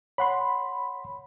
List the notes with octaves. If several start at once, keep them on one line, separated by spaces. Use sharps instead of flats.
C#5 F#5 B5 C6